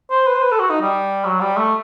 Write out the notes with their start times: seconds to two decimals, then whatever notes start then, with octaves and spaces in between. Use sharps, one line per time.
0.10 C5
0.27 B4
0.35 C5
0.43 B4
0.52 A4
0.59 F#4
0.70 D#4
0.81 G3
1.25 F#3
1.40 G3
1.57 A3